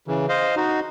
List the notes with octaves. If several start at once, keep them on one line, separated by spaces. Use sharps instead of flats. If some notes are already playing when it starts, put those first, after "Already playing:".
C#3 E3
C5 D#5 F5
D#4 F#4